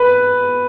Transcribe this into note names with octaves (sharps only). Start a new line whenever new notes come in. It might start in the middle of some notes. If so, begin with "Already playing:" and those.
Already playing: B4